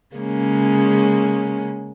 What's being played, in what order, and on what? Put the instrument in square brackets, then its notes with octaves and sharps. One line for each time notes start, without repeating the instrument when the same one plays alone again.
[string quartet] C#3 G#3 A#3 C#4